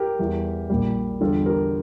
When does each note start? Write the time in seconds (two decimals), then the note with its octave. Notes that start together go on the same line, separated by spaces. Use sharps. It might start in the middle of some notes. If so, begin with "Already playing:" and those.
Already playing: G4 A#4
0.19 E2 E3 G3
0.70 A#1 A#2 G3
1.21 E2 D3 G3 F4 A4
1.46 G4 A#4